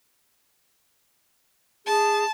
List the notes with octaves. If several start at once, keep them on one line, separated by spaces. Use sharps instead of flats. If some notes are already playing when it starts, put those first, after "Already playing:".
G#4 A5